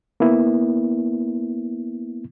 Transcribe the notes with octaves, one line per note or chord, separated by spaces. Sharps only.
A#3 B3 E4